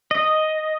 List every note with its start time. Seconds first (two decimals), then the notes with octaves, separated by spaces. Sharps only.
0.11 D#5